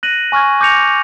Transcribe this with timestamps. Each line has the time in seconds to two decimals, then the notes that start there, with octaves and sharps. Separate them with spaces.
0.03 F#6 A#6 D#7 F#7
0.32 G#5 C#6 F6 G#6
0.61 D6 G6 A#6 C#7 F7